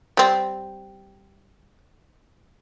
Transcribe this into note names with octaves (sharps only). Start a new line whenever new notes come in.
G3 C4